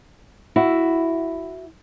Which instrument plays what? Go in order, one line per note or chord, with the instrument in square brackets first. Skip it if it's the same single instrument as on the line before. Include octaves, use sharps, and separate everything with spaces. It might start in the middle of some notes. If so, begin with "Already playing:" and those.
[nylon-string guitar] E4 F#4